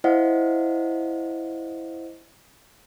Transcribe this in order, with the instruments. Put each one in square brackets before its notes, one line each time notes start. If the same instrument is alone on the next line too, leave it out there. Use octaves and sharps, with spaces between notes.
[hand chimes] E4 C5 D#5 F5 F#5